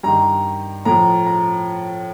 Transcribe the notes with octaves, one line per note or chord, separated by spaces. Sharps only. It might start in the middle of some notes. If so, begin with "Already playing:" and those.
G2 D#3 A#5
A2 F3 A#5
A#5